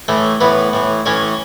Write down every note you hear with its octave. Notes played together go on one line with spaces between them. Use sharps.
A2 E3 A3 A4
A2 E3 B3 B4
A2 E3
A2 E3 C#4 C#5